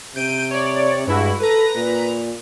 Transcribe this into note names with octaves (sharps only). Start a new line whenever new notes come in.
C3 G6 D7 D#7
C#5 D5
G2 G#3 E4 F#4
A4 B4 A#5
A#2